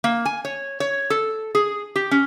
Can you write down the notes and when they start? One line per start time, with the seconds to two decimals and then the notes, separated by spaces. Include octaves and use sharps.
0.04 A#3
0.25 G#5
0.45 C#5
0.80 C#5
1.10 A4
1.55 G#4
1.96 G4
2.11 C#4